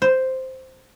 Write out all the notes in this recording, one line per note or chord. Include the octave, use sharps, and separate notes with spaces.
C5